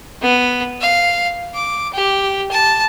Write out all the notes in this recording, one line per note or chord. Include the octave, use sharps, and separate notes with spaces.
B3
F5
D6
G4
A5